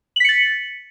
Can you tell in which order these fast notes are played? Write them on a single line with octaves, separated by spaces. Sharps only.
F#7 B6 C#7 A6